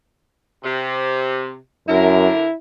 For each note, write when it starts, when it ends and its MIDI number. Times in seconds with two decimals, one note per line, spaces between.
0.63 1.55 48
1.88 2.31 42
1.88 2.45 50
1.88 2.54 64
1.88 2.45 70